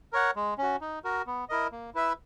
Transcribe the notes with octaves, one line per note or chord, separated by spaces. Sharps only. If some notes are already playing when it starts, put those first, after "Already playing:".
A#4 C#5 F#5
G#3
C#4 F#4
D#4
F#4 A#4
B3
E4 A#4 D#5
A#3
E4 B4 E5